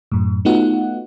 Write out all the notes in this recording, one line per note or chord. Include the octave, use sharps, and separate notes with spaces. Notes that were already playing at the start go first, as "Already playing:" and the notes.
F#2 A2
A3 B3 D#4 F4 F#4 F#5